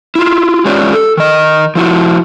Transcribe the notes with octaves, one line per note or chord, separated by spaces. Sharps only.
E4 F4
G#3 C#4 F4 G4 C#5 D5
A4
D#3 D#5
F3 E4 F#4